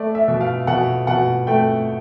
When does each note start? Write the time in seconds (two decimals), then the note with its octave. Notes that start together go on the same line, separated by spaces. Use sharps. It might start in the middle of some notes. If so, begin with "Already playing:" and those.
Already playing: A3 D5
0.15 E5
0.28 B2
0.41 F5
0.67 B2 F#5
1.07 B2 F#5
1.47 A3 G5